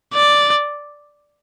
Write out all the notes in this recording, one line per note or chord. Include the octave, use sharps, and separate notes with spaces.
D5